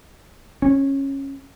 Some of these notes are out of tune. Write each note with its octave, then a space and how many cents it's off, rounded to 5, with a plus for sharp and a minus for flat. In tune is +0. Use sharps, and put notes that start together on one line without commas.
C#4 -15